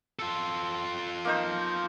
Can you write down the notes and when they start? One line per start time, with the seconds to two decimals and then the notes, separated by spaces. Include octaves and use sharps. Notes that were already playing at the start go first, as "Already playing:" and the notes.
0.19 F4 A4
1.25 A#3 D#4 C5